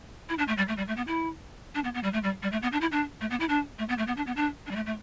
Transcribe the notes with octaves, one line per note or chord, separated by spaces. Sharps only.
E4
D4
A3
G3
A3
G3
A3
B3
E4
D4
B3
B3
G3
A3
G3
G3
A3
B3
D4
E4
D4
A3
B3
E4
D4
A3
B3
A3
B3
D4
B3
D4
D4
G3
A3
A3